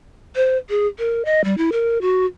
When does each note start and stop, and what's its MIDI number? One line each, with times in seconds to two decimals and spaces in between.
0.36 0.57 72
0.69 0.87 68
0.99 1.25 70
1.25 1.41 75
1.44 1.57 55
1.58 1.70 64
1.72 2.01 70
2.01 2.26 66